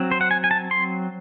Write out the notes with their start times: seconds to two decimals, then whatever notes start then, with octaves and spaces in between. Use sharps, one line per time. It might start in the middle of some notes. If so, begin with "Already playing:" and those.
Already playing: F#3 C4
0.11 C5
0.21 F#5
0.31 G#5
0.44 G#5
0.51 A5
0.71 C6